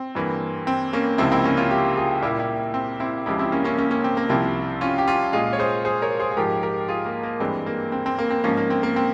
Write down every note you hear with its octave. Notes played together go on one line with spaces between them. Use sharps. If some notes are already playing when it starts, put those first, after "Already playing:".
Already playing: C4
G2 E3 A#3
C4
A#3 C#4
C#2 C3 F3 A#3 C4 E4
C4 E4
A#3 C#4
C#4 F4
E4 G4
F4 G#4
A#2 G3 A#3 E4 G4
E4 G4
C4
C4 E4
C#2 C#3 F3 G#3 E4 G4
C4 E4
A#3 C#4
A#3 C#4
A#3 C#4
A#3 C#4
C4
A#3
C2 C3 F3 C4 E4
C#4 F4
G4
C#4 F4
A#2 G#3 F4 G#4
C#5
G#4 C5
G#4 C5
A#4 C#5
G#4 C5
G#4
G#2 F3 G#3 G4 A#4
G4 A#4
F4 G#4
A#3
A#3
G2 E3 G#3 C4
A#3
C4
C4
A#3
C4
G#2 F3 A#3 C#4
A#3
C4
A#3
C4